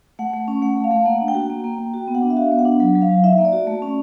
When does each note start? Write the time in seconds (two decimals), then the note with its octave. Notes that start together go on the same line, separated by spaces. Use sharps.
0.19 A3 F#5
0.33 A3
0.48 C#4
0.62 A3 F#5
0.77 A3
0.84 F5
0.91 A3
1.06 A#3 F#5
1.21 D4
1.28 G5
1.35 F#4
1.50 A#3
1.64 A#3
1.79 A#3
1.94 F#4
2.08 B3
2.15 F#5
2.22 D4
2.30 E5
2.37 F#4 F5
2.51 B3
2.59 F#5
2.65 D4
2.80 F#3 F#5
2.95 F#3
3.02 F5
3.09 F#3
3.24 D#4 E5
3.38 A#3
3.45 D5
3.53 F#4
3.67 A3
3.82 C#4